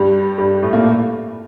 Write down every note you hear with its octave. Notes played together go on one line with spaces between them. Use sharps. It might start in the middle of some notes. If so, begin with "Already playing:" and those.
Already playing: G2 G3
G2 G3
A2 A3
A#2 A#3